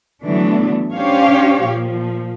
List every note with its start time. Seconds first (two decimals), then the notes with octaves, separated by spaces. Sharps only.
0.25 D3 E3 F#3 A3 B3 D4
0.94 C#4 D4 G4 C5 C#5 F5
1.65 A#2 F3